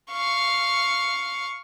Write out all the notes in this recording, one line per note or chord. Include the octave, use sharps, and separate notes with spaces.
F5 C#6